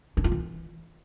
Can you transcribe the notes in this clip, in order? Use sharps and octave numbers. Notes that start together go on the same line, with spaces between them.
D4
F4
E3